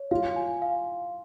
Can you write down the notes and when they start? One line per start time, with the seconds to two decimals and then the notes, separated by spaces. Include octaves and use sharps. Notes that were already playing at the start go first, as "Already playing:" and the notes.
Already playing: C#5
0.11 F4 F5
0.36 G#5
0.62 F5